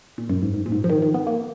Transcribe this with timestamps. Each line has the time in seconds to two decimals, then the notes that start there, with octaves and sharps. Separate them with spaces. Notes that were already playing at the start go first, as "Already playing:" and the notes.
0.18 A#2
0.30 F#2
0.43 G#2
0.54 G#2
0.66 A#2
0.72 G#2
0.84 F3
0.90 D#3
1.02 D#3
1.14 B3
1.27 A#3